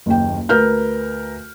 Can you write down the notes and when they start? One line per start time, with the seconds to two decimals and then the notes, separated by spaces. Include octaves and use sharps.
0.06 F#1 D#2 G5
0.49 D2 A#4 B4 F6 G6